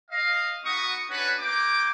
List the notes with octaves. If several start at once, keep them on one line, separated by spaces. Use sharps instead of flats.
D#5 F5
B3 D#4 F#4 C#6 D#6
C#4 D4 F#4 B4
A#3 G5 D6